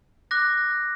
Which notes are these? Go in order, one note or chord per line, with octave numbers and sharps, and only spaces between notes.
D6 F#6 A#6